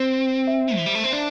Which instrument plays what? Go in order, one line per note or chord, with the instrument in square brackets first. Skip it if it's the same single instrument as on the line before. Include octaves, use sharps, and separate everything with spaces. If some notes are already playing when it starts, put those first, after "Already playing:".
Already playing: [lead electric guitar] C4 [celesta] C5
[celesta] E5
[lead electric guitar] E3
G3
A3
C4
D4